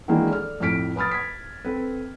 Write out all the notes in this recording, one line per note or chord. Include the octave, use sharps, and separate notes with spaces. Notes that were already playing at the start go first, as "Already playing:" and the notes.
D#3 E3 G#3 A#3 D4 F#4
A4 D5 F6
F2 A2 A3 F6 B6 D7
B4 B5 D#6 F6 A6
G#6 B6
C4 A4 B4